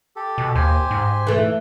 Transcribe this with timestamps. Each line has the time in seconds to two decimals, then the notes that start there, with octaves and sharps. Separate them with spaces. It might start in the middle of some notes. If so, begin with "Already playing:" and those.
0.16 G4 A4
0.38 B2
0.55 D#2 G4 C5 G#5
0.91 G#2
1.27 E3 A3